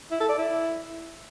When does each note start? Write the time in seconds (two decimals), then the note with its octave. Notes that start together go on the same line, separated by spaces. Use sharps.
0.11 E4
0.20 A4
0.29 D5
0.38 E4